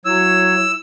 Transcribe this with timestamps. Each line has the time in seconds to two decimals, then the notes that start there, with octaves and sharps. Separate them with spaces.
0.05 F#3 E4 C#5 E6